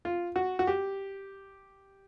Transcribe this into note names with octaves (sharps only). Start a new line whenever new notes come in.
F4
F#4
F#4
G4